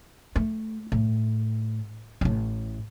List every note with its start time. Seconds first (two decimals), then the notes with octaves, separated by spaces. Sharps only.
0.36 A3
0.92 A2
2.21 A1 A2